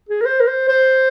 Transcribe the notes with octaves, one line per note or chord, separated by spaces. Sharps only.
G#4
A#4
C5
A#4
C5
C5